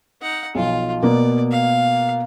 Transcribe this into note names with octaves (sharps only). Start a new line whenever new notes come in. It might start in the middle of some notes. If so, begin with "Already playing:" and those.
D#4 F#5
B1 F3 F4
B2 A#3 B3 D5
F5